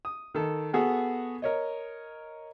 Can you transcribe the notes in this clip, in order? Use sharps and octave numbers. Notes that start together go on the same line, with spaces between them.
D#6
D#3 A4
B3 F#4 G#4 A4
A#4 C#5 D#5